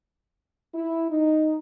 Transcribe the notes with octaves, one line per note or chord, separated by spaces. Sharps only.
E4
D#4